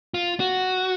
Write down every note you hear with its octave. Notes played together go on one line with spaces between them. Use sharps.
F4
F#4